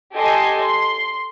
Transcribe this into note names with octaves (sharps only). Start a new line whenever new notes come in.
G4 A4 D#5 G#5 C6
C6